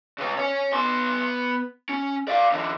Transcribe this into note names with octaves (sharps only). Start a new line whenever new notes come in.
C#3 B4
C#5 G#5
B3 C6
C#4
D5 F5
D3 E3